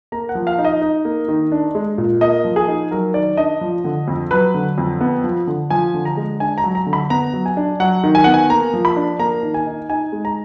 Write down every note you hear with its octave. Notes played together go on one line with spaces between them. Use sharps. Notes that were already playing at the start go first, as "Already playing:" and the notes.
A#3 A#5
F#5
F3
F5
D#4
D#5
D#4
A#3
D#3
D4
G#3
A#2
A#3 D#5
F3
G#4
D#4
F#3 A#4
D#3 D5
D4 D#5
F3
D3
F2
F#3 B4
D3
F2
B3
F3
D3
F3 G#5
D3
A#5
G#3
D4 G#5
A#5
F#3
A#5
D3
B5
B3 A#5
F#3
G#5
D4
F#3 F#5
D#3
G#5
B3 F#5
G#5
A#3 A#5
F3
B5
D4
A#3 A#5
D#3
G#5
D#4
D#4 G#5
G#3
A#5